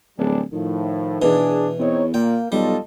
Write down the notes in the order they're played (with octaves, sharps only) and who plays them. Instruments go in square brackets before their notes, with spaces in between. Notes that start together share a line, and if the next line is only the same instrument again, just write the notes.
[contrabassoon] D1 [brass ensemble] G3 D4 G#4
[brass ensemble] A2 F3 [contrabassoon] D#3
[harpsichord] B2 E3 [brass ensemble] D4 G#4
[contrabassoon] E2 [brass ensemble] C4 D#4 C#5
[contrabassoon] A#2 [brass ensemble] A#3 [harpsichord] G5
[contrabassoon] B1 [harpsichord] G3 [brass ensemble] F4 A4 D#5